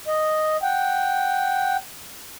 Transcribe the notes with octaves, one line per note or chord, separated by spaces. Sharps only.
D#5
F#5 G5